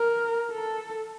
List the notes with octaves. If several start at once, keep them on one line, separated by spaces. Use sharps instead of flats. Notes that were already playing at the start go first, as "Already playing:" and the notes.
Already playing: A#4
A4